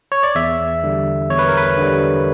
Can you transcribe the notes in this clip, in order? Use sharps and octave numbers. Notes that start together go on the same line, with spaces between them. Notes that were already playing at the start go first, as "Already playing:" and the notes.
C#5
D5
E2 E5
D3 G3
E2 C#5
B4
A#4
B4
D3 G3